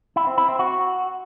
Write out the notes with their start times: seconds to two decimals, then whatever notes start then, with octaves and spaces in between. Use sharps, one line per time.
0.16 E4
0.27 C4
0.38 E4
0.48 C4
0.59 F#4